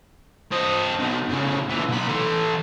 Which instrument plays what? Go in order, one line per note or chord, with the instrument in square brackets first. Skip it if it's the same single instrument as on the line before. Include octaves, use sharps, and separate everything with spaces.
[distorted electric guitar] C4 D#5
B2 D#4
A2 C#3
A#2 E3
B1 B5
E3 A4